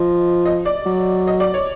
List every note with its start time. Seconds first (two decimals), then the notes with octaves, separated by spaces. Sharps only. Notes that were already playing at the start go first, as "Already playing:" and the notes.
Already playing: F3 D#5
0.46 D#5
0.66 D5
0.86 F#3
1.27 D#5
1.40 D5
1.54 C#5